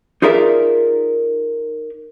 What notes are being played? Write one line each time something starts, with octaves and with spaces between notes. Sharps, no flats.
D#4 F4 G#4 A#4 D5 E5